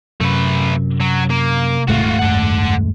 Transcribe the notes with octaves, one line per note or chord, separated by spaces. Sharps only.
F#2 C3 A3 B4
F#3
A#3
D#1 G#2 A3 F4 F#4
F#2 A4 F#5